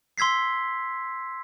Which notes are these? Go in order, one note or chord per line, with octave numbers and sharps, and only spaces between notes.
C6 E6 G#6 B6 C7